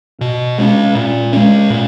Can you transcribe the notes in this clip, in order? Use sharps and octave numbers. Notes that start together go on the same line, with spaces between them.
B2
G#3 C#4
A#2
G#3 C#4
A#2